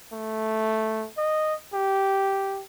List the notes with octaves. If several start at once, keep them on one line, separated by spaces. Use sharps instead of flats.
A3
D#5
G4